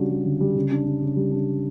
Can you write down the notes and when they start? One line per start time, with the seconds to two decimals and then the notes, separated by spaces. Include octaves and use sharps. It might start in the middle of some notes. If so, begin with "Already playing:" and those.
Already playing: C#3 G3 D4 F#4
0.10 G3
0.25 D3
0.41 G3
0.56 C#3
0.71 D4
0.86 C#3
1.02 C#3
1.16 G3
1.32 D4